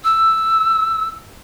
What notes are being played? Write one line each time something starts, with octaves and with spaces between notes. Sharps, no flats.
E6